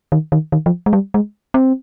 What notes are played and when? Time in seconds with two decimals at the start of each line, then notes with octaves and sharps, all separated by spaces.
0.12 D#3
0.32 D#3
0.52 D#3
0.66 F3
0.86 G#3
0.93 G3
1.14 G#3
1.54 C4